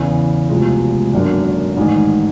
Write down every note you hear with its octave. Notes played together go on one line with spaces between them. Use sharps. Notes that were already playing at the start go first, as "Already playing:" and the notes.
Already playing: E2 C#3 E3
E1 D2 C3 F3 G#3
G#1 F#2 D3 F#3 A#3
A1 G#2 D#3